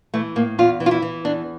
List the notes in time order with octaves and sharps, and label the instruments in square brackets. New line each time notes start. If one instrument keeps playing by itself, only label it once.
[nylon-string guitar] E3 A3
A2 A#3
E2 F4
E3
F4
E4
E3
E2 D4